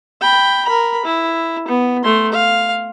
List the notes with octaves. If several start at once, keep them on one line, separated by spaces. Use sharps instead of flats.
G5 B5
A#4 B5
E4
B3
A3 C6
F5